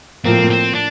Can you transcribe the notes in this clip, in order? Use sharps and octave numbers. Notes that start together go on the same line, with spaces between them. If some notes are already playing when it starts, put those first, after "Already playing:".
A2 F3 A#3 C4
C4
D4